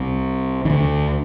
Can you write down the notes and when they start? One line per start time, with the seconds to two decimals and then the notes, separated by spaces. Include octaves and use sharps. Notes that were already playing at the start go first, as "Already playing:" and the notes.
Already playing: C2 C3
0.65 D#3
0.70 D2 D3